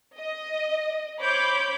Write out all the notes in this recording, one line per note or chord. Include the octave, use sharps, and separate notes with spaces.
D#5
C5 C#5 B5 D6 G6